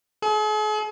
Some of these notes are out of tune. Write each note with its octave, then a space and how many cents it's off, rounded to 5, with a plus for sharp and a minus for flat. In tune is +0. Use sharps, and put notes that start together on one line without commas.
G#4 +45